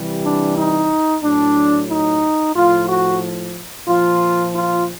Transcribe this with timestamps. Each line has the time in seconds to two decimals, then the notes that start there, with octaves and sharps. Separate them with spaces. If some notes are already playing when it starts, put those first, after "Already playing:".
Already playing: C3 E3 G3
0.23 D4
0.57 D#4
1.23 A2 F#3 D4
1.90 D#4
2.55 A2 F3 F4
2.89 F#4
3.88 A#2 F3 F4
4.54 F4